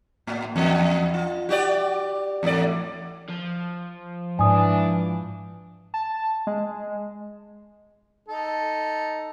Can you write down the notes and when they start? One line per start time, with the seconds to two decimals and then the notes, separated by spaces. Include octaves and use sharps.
0.27 A2
0.56 E2
1.14 F4
1.49 F#4 G4 D5
2.43 E2 A2 D5
3.29 F3
4.39 G#2 E3 D4 G#5 D#6
5.94 A5
6.47 G#3
8.28 D#4 A4